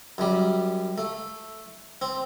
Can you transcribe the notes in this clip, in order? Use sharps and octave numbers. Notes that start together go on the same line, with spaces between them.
F#2 G3
A3
C4